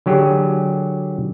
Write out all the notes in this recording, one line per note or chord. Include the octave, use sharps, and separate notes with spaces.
D3 F#3 G4 G#4